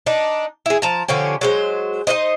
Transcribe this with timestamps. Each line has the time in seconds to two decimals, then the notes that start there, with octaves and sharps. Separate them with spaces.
0.06 D4 D#4
0.66 E4 G#4
0.82 F3 A5 A#5
1.08 D3 F3 C#4 G4
1.41 F#3 G#3 C5
2.07 D#4 F#4 C5 D#5